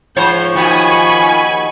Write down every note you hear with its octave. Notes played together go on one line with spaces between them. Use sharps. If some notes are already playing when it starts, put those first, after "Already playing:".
G#2 F3 C5 C#5 G6
D#2 D#3 F#4 G#5 B5 C#6